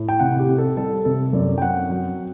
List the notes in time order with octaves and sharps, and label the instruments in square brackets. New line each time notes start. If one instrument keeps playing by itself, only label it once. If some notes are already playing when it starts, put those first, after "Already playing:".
Already playing: [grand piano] A2
G5
C3 F#5
G4
C4
A4
G3 A4
C3 A4
F#2 D5
G5
C4 F#5
F#3